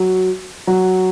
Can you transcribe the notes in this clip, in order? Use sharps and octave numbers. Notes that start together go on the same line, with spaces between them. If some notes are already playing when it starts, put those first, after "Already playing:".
Already playing: F#3
F#3